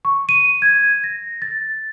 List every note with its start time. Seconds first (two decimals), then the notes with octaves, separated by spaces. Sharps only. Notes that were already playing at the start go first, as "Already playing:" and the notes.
0.05 C#6
0.29 D#7
0.62 G#6
1.04 A#6
1.42 A6